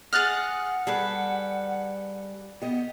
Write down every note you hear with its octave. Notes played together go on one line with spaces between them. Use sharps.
G#4 D#5 F#5 F6 F#6 A6
G3 G#4 A4 B4
B3 G4 D#5